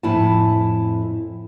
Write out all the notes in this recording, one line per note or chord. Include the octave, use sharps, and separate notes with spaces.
F2 A2 E4 E5 G#5 A5